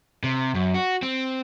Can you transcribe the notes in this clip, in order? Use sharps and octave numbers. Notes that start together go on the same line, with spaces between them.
C3
F#2
F#4
C4